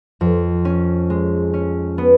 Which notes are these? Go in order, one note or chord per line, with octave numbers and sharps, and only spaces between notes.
F2
C#4
G#3
C#4
B3